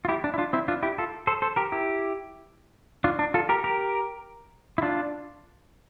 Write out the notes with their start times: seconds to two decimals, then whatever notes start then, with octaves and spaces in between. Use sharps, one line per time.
0.05 F4
0.08 E4 G4
0.24 D4
0.34 E4
0.38 D4 F4
0.53 C4 E4
0.68 D4 F4
0.83 E4 G4
0.98 F4 A4
1.27 A4 C5
1.42 A4 C5
1.56 G4 A#4
1.72 E4 G4
3.04 D4 F4
3.19 D4
3.34 F4 A4
3.49 G4 A#4
3.64 G4 A#4
4.78 E4
4.82 D4 F4